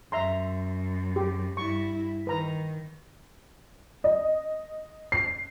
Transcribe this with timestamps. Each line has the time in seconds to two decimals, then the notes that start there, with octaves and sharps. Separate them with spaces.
0.12 F#2 E5 A#5 C6
1.16 G4
1.57 G2 E4 C#6
2.27 D#3 B4 A#5
4.04 D#5
5.12 C7